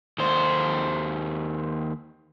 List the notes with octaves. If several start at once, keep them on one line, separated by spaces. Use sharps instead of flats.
D#2 C5